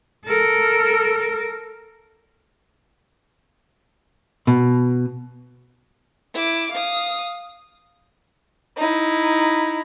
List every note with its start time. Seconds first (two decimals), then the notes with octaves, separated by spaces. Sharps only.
0.25 A4 A#4
4.47 B2
6.34 E4 D6
6.72 F5 D#6
8.77 D#4 E4